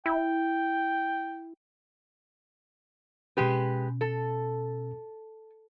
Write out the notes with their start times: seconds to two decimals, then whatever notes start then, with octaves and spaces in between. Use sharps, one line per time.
0.06 E4 G5
3.37 B2 G#3 C#4 G4 B4
4.01 A4